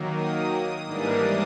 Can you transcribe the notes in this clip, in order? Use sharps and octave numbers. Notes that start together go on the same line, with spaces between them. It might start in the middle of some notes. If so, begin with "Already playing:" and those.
Already playing: D#3 F#3 A#3
D#6
G#2 E3 G3 A#3 D4